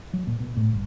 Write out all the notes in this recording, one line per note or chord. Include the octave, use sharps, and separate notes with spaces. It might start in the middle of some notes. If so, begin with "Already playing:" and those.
F#3
A#2
B2
A2
G1